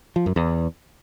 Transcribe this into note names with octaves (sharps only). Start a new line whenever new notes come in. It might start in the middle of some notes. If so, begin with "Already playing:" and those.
F3
F#2
E2